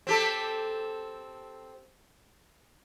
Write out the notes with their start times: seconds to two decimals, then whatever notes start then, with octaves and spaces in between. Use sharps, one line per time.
0.07 C4 G4 A4